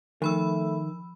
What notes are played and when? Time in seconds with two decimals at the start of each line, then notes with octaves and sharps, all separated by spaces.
0.22 D#3 F3 A3 B5 E6